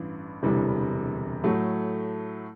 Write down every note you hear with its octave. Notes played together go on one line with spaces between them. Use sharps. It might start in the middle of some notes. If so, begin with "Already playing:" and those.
Already playing: A1 G2 E3
E1 D2 C3 E3 G3
A2 F#3 A3